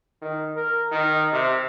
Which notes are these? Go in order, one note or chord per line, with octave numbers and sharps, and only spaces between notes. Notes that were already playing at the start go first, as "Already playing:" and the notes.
D#3
A#4
D#3
C3